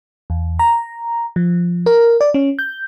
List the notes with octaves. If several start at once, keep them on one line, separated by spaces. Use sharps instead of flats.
E2
A#5
F3
A#4
D5
C#4
G6